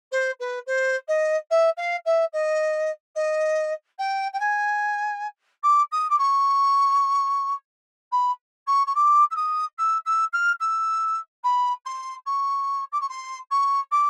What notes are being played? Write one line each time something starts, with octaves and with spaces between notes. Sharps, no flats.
C5
B4
C5
D#5
E5
F5
E5
D#5
D#5
G5
G5
G#5
D6
D#6
D6
C#6
B5
C#6
C#6
D6
E6
D#6
E6
E6
F6
E6
B5
C6
C#6
D6
C#6
C6
C#6
D6